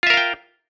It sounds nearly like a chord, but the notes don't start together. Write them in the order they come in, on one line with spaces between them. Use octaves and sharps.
F4 E5 A#4 F5 G5